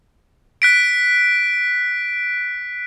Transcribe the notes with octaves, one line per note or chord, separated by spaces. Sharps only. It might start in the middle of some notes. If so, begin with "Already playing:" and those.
F#6 B6 D7